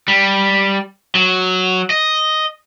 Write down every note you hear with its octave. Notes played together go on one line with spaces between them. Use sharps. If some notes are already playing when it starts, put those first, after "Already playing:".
G3
F#3
D#5